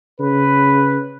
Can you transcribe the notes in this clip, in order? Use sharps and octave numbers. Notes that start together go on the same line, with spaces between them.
C#3 B4